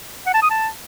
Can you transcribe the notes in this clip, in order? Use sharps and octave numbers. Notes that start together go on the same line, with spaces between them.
F#5
A5
D#6
A5